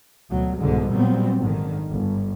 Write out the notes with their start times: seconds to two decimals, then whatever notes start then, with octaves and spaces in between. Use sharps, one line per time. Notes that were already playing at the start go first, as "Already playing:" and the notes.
0.30 D2 B2 F#3
0.60 C2 G#2 B2 D3 G#3
0.92 A#2 F#3 G3 B3 C4
1.40 G#1 D3 D#3
1.90 G1